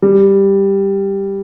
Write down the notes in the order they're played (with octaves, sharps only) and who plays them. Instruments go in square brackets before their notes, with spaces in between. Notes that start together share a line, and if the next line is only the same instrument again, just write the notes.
[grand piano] G3